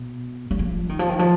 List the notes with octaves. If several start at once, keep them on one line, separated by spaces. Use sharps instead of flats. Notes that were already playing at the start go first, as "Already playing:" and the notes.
Already playing: B2
F#3
F3
D#3
F3
D#3
F3